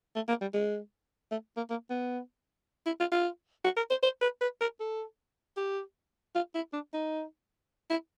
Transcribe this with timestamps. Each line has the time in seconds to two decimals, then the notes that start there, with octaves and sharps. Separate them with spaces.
0.16 A3
0.28 A#3
0.41 G3
0.54 G#3
1.31 A3
1.57 A#3
1.70 A#3
1.90 B3
2.86 E4
3.00 F4
3.12 F4
3.64 F#4
3.77 A#4
3.90 C5
4.03 C5
4.21 B4
4.41 B4
4.61 A#4
4.80 A4
5.57 G4
6.35 F4
6.55 E4
6.73 D4
6.94 D#4
7.90 E4